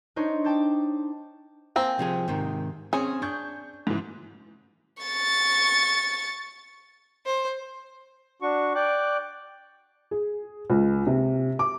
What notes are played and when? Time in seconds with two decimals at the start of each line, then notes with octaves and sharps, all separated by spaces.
0.16 D4 D#4 C5 C#5
0.44 G5 A5 D6 G6 A6
1.76 A#3 C4 C5 G#5
1.99 C3 F3 G#4
2.28 G#2 C3 D#3
2.93 C4 C#4 G#4 C#5
3.22 D4 C#6 G6
3.87 G#2 C#3 E3
5.03 C#6 A6
7.26 C5
8.42 D4 F#4 C#6
8.75 D5 G5 D6 F#6
10.11 G#4
10.70 C#2
11.07 C3
11.59 D6